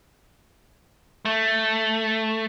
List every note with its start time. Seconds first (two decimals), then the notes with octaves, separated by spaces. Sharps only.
1.25 A3